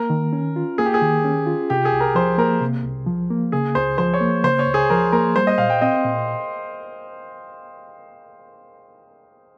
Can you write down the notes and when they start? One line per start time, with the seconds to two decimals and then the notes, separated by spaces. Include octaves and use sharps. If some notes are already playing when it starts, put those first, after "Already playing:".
Already playing: A#3 A#4
0.10 D#3
0.33 C#4
0.56 F4
0.78 A#3 G#4
0.85 G4
0.94 G#4
1.02 D#3
1.24 C#4
1.46 F4
1.70 C3 G4
1.85 G#4
1.93 C2
2.00 A#4
2.15 F3 C5
2.38 A#3 A#4
2.61 C3
2.84 C2
3.07 F3
3.30 A#3
3.52 C#3 G#4
3.75 C#2 C5
3.98 F3 C5
4.14 C#5
4.21 A#3
4.44 C#3 C5
4.59 C#5
4.67 C#2
4.74 G#4
4.90 F3 A#4
5.12 A#3 A#4
5.36 G3 C5
5.47 D#5
5.58 A#2 F5
5.70 G5
5.81 C4 D#5
6.04 A#2